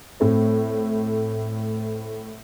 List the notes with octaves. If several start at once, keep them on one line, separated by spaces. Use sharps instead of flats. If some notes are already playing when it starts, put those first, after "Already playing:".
A2 A3 C4